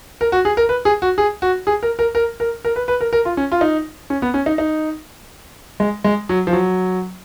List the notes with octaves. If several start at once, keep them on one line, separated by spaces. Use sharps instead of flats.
A#4
F#4
G#4
A#4
B4
G#4
F#4
G#4
F#4
G#4
A#4
A#4
A#4
A#4
A#4
B4
B4
A#4
A#4
F4
C#4
F4
D#4
C#4
B3
C#4
D#4
D#4
G#3
G#3
F#3
F3
F#3